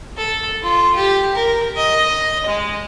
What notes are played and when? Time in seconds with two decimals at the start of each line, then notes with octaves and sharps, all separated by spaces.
0.17 A4
0.62 F4
0.95 G4
1.35 A#4
1.76 D#5
2.46 G#3